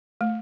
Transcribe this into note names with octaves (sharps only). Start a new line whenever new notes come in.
A3